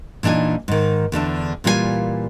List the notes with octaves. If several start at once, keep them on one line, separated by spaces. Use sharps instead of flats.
A#2 E3 D4 D#4 G#5
G#2 D#3
E2 D3 D4 E5
A#2 E3 G3 F4 C5 G#5